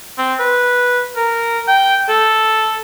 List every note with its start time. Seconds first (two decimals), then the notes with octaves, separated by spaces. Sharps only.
0.18 C4
0.40 B4
1.17 A#4
1.68 G5
2.09 A4